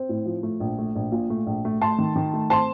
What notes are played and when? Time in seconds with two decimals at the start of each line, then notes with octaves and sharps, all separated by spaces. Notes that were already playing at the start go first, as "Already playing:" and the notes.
Already playing: C4
0.09 A2
0.26 F3
0.43 A3
0.60 A#1
0.79 A3
0.96 A#1
1.12 A#2
1.30 A3
1.47 A#1
1.65 A3
1.81 A3 A5 C6
1.98 D#3
2.16 D#3
2.34 A3
2.50 C4 A5 C6